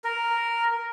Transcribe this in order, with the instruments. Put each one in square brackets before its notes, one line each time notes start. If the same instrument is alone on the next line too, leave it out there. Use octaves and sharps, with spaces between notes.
[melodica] A#4